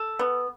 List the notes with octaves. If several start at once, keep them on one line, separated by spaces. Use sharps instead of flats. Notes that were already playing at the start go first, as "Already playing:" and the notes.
Already playing: A4
B3